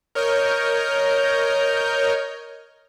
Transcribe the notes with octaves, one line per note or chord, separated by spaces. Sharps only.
A#4 C#5 D#5 F6 G6